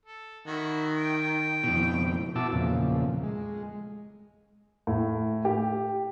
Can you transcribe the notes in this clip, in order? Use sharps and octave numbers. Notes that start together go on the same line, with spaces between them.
A4
D#3 E4 F#4
G5
F2 B2 E4
B2 E4 F#4 A5 D6 E6
E2 A#2 C#3 F3
G#3
A2
G4